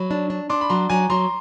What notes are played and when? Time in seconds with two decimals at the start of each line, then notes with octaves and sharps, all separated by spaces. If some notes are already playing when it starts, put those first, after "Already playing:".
Already playing: F#3 B5
0.11 D4
0.30 D4
0.50 D4 C6 D6
0.61 B5
0.70 F#3 A#5 C6
0.90 F#3 G#5 A#5
1.10 F#3 A#5 C6